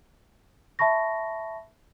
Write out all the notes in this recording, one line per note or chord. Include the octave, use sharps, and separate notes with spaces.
E5 A5 B5 C#6 A#6